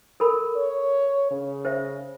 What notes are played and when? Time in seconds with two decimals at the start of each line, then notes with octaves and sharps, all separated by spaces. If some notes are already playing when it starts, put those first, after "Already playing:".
0.20 A4 A#4 B5
0.56 C#5
1.31 C#3
1.65 C5 E5